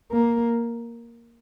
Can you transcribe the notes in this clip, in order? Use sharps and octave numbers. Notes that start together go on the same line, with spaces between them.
A#3